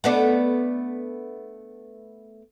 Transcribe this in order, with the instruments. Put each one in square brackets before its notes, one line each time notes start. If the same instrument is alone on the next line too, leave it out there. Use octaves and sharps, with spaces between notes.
[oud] A3 B3 D4